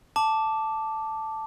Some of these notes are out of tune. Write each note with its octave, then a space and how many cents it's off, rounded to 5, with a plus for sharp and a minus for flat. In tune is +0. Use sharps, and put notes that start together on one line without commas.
A5 +0 D6 +0